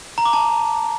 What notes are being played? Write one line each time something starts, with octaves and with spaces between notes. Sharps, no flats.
A#5
D6
A5